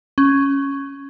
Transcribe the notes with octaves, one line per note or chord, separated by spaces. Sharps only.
C#4